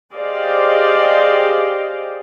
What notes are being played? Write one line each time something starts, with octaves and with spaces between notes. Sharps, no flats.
G4 G#4 C5 D5 D#5 F5